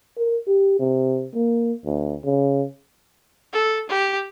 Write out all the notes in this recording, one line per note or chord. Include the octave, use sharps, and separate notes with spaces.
A#4
G4
C3
A#3
D2
C#3
A4
G4